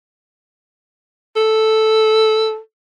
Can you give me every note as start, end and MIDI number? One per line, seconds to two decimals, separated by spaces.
1.36 2.58 69